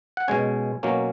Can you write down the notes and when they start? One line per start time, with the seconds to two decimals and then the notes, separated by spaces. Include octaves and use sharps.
0.17 F#5
0.28 B2 G#3 C#4 G#5
0.83 B2 F#3 A#3 C#4